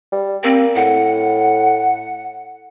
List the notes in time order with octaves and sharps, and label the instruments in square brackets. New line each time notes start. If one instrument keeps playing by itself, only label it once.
[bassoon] G3
[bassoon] A#3 [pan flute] C4
[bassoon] A2 [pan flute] F#5